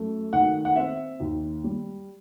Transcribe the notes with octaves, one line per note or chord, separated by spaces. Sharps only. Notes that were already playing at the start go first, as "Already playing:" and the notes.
Already playing: F#2 A3
D#3 F#5
F#5
C4 E5
D#2
G3